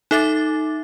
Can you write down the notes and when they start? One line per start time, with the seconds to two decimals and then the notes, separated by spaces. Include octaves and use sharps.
0.11 D#4 A4 E5 D6 A6